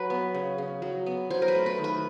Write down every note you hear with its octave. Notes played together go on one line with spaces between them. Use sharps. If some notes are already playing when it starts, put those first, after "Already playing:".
Already playing: F#3 B4
B3
C#3
C#3
F#3
B3
F#3 C5
A#4
B4
A3
B4
D#3
B4